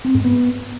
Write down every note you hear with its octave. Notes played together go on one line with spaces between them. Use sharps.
C4
G#2
B3